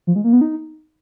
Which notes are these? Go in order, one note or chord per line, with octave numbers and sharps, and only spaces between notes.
F3
G#3
A#3
B3
D#4